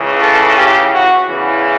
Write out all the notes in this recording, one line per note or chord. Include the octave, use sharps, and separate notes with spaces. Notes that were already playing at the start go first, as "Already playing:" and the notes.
Already playing: C#2 C#3 E3
A4
G4
F#4
E2 C#3 E3